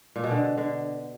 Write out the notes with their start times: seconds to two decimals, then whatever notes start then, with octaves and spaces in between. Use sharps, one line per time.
0.16 A#2
0.24 B2
0.31 D3
0.57 D3